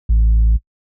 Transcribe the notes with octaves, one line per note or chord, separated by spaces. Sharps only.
A1